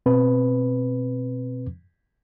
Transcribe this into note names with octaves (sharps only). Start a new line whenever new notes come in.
B2 C4 B4